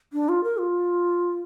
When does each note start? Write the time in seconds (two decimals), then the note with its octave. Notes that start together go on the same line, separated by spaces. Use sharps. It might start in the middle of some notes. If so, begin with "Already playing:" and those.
0.13 D4
0.29 F4
0.44 A#4
0.59 F4